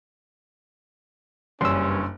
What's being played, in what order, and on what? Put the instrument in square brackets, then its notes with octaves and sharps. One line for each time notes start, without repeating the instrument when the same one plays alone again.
[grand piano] F#1 [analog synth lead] G2 [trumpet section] C#4 [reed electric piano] C6 E6